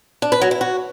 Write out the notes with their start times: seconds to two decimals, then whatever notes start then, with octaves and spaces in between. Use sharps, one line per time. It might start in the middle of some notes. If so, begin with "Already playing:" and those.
0.22 D4
0.32 B4
0.42 F#3
0.51 E4
0.61 F#4